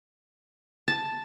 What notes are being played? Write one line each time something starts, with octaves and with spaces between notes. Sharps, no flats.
A5